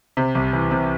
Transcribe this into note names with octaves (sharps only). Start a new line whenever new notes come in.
C3
C2
E3
C3